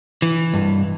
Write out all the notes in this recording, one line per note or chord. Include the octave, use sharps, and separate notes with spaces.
E3
G2